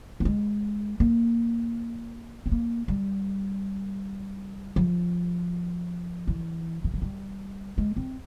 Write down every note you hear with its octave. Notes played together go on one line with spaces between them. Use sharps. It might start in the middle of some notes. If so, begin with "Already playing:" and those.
A#3
G#3
A#3
C4
A#3
G3
F3
E3
E3
F3
G3
G#3
C4